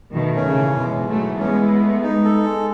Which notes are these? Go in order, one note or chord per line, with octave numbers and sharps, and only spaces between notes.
B2 D#3 A3
C#4
C#3
E3
B2 G#3
G#2
F#3 A3
E3
G#3 B3 C#4
E4
A3
D#4
A4
G#3